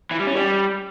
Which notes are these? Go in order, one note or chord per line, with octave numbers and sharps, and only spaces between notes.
E3
G3
C#4
G3